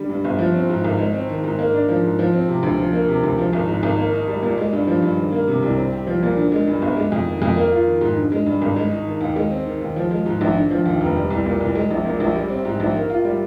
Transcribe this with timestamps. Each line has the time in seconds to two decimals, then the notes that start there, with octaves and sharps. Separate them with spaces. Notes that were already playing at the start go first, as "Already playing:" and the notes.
Already playing: D3 G3
0.09 G2
0.24 G1
0.39 F3
0.54 C4
0.69 G#2
0.84 G#1
0.99 G#3
1.14 C4
1.29 D#3
1.44 G#2
1.59 A#3
1.74 D4
1.89 F3
2.03 G#2
2.19 F3
2.33 C4
2.48 C3
2.63 D2
2.78 F3
2.93 A#3
3.08 C3
3.23 D2
3.38 F3
3.53 G#1
3.68 G#2
3.83 G#1
3.98 A#3
4.13 D#4
4.28 G3
4.43 A#2
4.58 G#3
4.73 G2
4.87 F3
5.02 G2
5.18 D#3
5.32 A#3
5.48 C3
5.62 C2
5.77 C4
5.93 G4
6.07 F3
6.23 A#2
6.37 D3
6.52 G#3
6.67 G2
6.82 G1
6.97 G#3
7.12 F2
7.27 D#3
7.42 F2
7.56 A#3
7.71 F4
7.86 D#3
8.01 G#2
8.17 D3
8.32 G#3
8.46 G2
8.62 G#1
8.76 G#3
8.91 D#4
9.07 D#3
9.21 D#2
9.36 G#3
9.51 C4
9.66 D#3
9.81 D#2
9.96 F3
10.11 G#3
10.26 G#2
10.41 A#1
10.55 D3
10.71 F3
10.86 D#2
11.01 F1
11.16 G3
11.30 C2
11.46 A#2
11.60 C2
11.75 G#3
11.90 A#1
12.05 A#2
12.20 A#1
12.35 G3
12.50 C4
12.65 G#2
12.80 A#1
12.95 A#3
13.10 F4
13.25 G3